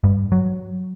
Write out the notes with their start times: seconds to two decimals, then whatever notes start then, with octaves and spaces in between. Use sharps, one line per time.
0.04 G2
0.32 F#3